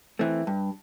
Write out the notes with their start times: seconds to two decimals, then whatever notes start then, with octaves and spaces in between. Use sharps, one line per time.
0.19 E3 A3 C4
0.47 G2